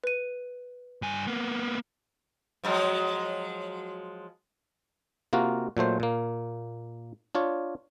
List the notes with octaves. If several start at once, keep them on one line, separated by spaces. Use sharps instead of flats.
B4 D#7
G2 G#5
A#3 B3
F3 F#3 G#3
C3 A#3 F4 F#4 A#4
A#2 F#3 A3 C5
A#2 A#3
D4 F4 C#5